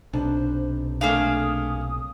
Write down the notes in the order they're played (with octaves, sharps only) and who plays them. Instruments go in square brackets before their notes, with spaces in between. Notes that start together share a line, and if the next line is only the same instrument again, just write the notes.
[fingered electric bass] B1 C3 [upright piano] D4 [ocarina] C5
[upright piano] A3 D4 [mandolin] A#3 G#4 F5 [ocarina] D#6